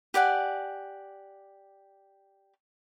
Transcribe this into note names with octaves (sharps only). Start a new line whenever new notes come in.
G4 D5 F#5 G#5